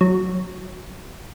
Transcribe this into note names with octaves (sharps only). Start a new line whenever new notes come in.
F#3